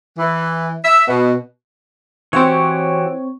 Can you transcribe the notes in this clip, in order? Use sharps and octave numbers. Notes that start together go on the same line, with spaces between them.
E3
E5
B2
E3 C4 F#4 G4 C#5